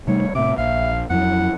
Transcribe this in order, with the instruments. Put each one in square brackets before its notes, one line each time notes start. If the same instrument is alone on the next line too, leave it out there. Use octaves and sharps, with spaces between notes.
[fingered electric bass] C3 G3 A3 [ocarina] D#4 [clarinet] C#5
[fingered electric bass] A2 C3 [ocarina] E5 [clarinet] D6
[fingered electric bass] A#1 [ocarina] E5 [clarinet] F5
[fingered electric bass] F2 F#3 [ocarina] E4 [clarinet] F#5